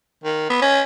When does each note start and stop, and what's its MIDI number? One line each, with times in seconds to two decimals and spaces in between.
0.24 0.47 51
0.50 0.60 59
0.62 0.82 61